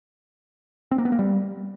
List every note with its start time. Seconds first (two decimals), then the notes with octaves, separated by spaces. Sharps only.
0.91 C4
0.98 A#3
1.05 B3
1.12 A#3
1.19 G3